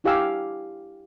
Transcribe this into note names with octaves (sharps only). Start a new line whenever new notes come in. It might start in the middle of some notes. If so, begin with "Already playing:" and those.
D4 E4 G4 F5 G#5 E6